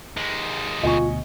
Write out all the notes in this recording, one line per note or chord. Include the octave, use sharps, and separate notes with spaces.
D#2 G#3
D2 B2 F4 D#5 G#5 C#6